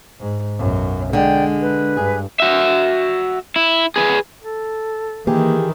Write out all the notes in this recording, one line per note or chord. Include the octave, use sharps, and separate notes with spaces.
G#2
B1 F#2
D3 G#3 D4 D5 G5
B4
G2 G#4
F#4 E5
E4
G#4 B4
A4
D#3 E3 A#3 G4 G#4